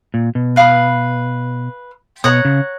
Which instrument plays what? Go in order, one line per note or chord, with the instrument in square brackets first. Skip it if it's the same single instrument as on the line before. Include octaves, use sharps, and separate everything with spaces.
[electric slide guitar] A#2
B2
[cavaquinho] B4 F5 B5 D#6
[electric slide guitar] B2 [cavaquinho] C#5 F#5 A#5 D#6
[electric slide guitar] C#3